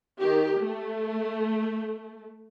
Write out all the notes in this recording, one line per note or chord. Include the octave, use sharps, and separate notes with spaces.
D#3 G4
A3